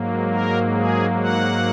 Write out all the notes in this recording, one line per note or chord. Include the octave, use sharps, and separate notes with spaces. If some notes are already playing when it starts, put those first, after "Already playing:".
Already playing: G#2 F#3 A#3
A#4
G#4
F#5